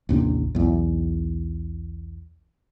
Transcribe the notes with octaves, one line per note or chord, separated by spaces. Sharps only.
A1 D#2 C3 D4
B1 E2